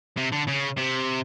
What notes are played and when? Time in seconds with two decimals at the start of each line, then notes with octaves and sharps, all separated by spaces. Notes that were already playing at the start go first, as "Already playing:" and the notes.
0.17 C3
0.32 D3
0.48 C#3
0.78 C3